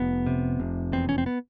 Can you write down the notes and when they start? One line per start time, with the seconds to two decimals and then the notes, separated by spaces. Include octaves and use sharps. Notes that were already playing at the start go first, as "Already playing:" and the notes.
Already playing: F1 B3
0.26 C3
0.60 F1
0.92 E2 C4
1.09 C#4
1.18 C4
1.26 B3